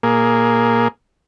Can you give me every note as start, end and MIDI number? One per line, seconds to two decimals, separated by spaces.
0.03 0.88 46
0.03 0.88 58
0.03 0.88 68